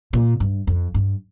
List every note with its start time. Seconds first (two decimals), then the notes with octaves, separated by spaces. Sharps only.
0.13 A#2
0.40 G2
0.67 F2
0.94 G2